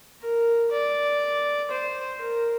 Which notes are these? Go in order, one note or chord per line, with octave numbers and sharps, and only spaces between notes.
A#4
D5
C5
A#4